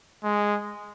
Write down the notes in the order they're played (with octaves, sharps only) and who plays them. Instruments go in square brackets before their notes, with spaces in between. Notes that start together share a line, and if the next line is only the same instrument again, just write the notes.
[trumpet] G#3